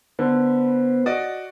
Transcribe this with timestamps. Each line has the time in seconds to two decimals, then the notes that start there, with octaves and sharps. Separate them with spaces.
0.19 D3 B3 B4 C5
1.06 F#4 D5 D#5